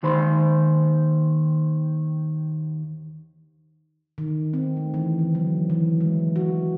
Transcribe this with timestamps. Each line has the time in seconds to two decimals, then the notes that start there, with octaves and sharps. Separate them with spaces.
0.03 D#2 D#3 C5 B5
4.18 D#3
4.53 C4
4.77 A3
4.94 E3
5.19 D3
5.35 F#3
5.70 E3
6.01 G#3
6.36 F#4